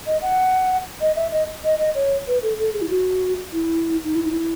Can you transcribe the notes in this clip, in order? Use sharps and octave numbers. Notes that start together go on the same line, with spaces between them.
D#5
F#5
D#5
E5
D#5
D#5
D#5
C#5
B4
A4
A4
G#4
E4
F#4
E4
D#4
E4
D#4
E4